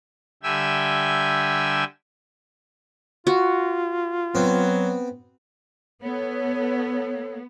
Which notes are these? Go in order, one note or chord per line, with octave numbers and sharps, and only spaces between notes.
D3 G3 E5 G5 G#5 E6
F4 F#4
F#3 B3 C4
B3 A4 C#5